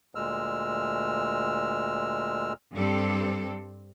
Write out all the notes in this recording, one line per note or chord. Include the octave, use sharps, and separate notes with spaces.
D2 A#2 G#3 E6 F6
G2 G3 C4 A4